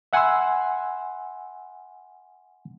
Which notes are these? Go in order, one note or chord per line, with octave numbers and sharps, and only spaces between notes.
E5 F#5 G#5 B5 C6 E6